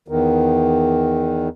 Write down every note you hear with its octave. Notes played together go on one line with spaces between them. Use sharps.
E2 D#3